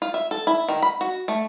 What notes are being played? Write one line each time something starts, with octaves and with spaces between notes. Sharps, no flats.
F4
E5
A4
E4
D#3
B5
F#4
A3